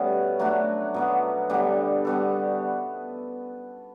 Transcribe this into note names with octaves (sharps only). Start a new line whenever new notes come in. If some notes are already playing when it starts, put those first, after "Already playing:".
Already playing: B2 G3 A3 C#4 B4
F#3 A3 D4 F#4
B2 F#3 B3
D3 G3 B3 D4
G3 B3 F#4 A4